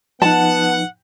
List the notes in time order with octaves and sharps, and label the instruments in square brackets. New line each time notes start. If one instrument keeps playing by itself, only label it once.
[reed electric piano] F3 D#4 [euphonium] B3 [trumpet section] F#5 [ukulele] A5